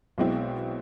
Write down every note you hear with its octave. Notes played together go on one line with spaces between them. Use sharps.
B1 B2 G#3 C4 E4